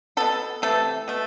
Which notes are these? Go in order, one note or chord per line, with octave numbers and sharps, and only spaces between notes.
B2 B3 A4
C3 E3 A3 A4
B2 A3